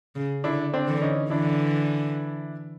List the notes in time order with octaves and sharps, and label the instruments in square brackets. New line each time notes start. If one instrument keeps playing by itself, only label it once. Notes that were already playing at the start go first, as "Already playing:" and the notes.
[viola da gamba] C#3
[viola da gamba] D3 [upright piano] D4 E4
[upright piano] C4 D4
[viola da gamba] D3 E3
[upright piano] C#4 D#4
[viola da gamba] D3 E3 [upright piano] D4 E4